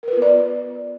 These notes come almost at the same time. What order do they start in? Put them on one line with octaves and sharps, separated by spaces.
A#4 B4 F4 B3 D5